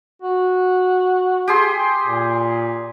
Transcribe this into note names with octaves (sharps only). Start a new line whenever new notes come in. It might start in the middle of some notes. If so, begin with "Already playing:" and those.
F#4
G4 G#4 C6
A#2